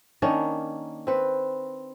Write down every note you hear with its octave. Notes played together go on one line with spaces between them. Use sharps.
D#3 A#3 C#4 D4
C4 B4